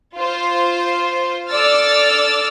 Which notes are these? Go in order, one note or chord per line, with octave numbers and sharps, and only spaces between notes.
F4 C5
A4 D5 E6 F6 A6